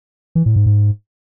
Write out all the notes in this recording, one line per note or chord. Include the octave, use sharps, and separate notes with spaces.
E3
A2
G#2
G#2